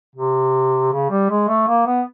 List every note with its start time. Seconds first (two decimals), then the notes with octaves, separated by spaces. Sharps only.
0.16 C3
0.92 C#3
1.10 G3
1.30 G#3
1.48 A3
1.68 A#3
1.87 B3